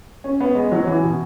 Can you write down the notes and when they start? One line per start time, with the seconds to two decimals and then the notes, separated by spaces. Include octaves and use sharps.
0.24 C#4
0.41 B3
0.55 G#3
0.72 F#3
0.87 E3
1.03 B2